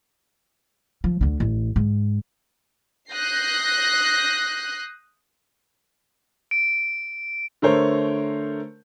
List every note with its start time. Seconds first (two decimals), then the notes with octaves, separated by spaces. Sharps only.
1.04 F3
1.21 D2 D3
1.40 A1
1.76 G#2
3.11 D#6 F#6 G6 A#6 C7
6.51 D7
7.62 D3 A3 A#4 C5 C#5